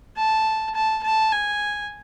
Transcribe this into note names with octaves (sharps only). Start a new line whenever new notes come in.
A5
A5
A5
G#5